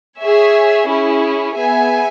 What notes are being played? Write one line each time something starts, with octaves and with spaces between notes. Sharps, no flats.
G#4 C#5 E5 G#5
C#4 E4 G#4
B3 G#4 E5 G#5